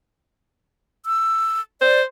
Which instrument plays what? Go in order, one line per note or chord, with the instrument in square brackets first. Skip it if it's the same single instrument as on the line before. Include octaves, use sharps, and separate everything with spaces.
[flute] E6
[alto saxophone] C5 [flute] D5